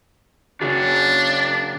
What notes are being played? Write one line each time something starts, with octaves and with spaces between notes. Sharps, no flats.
C#3 D4 F#4 G#4